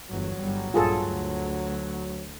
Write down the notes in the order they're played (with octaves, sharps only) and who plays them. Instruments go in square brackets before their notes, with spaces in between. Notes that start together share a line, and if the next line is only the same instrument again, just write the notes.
[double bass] G1 E2 [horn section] F#3
[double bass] G1 G3
[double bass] A#1 G2 [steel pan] F4 G#4 A4
[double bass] D2